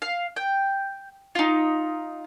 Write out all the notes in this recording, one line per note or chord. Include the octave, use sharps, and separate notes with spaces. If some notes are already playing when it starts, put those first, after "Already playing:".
F5
G5
D#4 F4